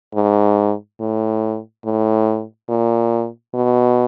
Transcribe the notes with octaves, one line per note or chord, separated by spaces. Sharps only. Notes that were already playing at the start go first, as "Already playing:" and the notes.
G#2
A2
A2
A#2
B2